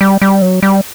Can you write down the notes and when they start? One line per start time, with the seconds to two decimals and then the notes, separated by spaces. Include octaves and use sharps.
0.01 G3
0.22 G3
0.42 F#3
0.63 G3